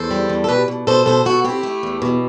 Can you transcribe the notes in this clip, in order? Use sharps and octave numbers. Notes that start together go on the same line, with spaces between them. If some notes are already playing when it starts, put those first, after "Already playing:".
Already playing: E2 A4 C5
G3
E2
A4
B2 G4 B4
B2
B2 A4 C5
B2 A4 C5
B2 F#4 A4
C4 E4 G4
A3
E2
B2